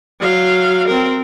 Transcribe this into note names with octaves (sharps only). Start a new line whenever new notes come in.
F#3 F5
C4 A#4